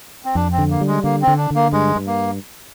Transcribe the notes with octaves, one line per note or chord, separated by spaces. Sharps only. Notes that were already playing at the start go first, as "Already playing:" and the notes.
C4
F2 D4
C4
D3
A#3
G3
G#3
D3 A#3
C4
D3
D4
D3 A#3
G2 G#3
G2
A#3